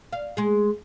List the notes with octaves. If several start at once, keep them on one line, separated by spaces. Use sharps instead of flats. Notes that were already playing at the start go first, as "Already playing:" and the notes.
F5
G#3 G#4